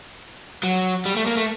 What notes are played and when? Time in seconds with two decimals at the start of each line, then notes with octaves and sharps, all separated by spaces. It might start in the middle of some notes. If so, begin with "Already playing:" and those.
0.63 F#3
1.06 G3
1.16 A3
1.26 A#3
1.37 A3